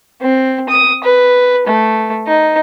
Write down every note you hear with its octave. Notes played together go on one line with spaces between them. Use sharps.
C4
D#6
B4
A3
D#4